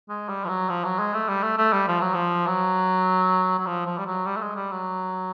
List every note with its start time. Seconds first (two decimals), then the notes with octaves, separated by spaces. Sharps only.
0.09 G#3
0.29 G3
0.45 F3
0.49 F#3
0.69 F3
0.84 F#3
0.99 G#3
1.14 A3
1.29 G3
1.43 A3
1.58 A3
1.73 G3
1.88 F3
2.01 F#3
2.14 F3
2.47 F#3
3.59 F#3
3.67 F3
3.86 F3
3.98 G3
4.06 F#3
4.26 G3
4.37 A3
4.42 G#3
4.56 G3
4.71 F#3